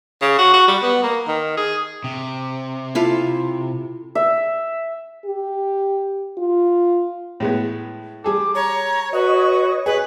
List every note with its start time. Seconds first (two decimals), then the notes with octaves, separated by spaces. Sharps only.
0.22 C#3
0.39 F#4
0.54 F#4
0.68 G3
0.82 B3
1.03 A#3
1.28 D#3
1.57 G#4
2.04 C3
2.95 E4 F4 A4
4.15 E5
5.25 G4
6.38 F4
7.40 A2 G#3 B3
8.24 G3 G#4 A4 D6
8.55 C#5 A#5
9.13 F#4 B4 C#5 D#5
9.86 G#4 B4 G#5